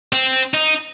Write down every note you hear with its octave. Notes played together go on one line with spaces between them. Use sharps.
C4
D#4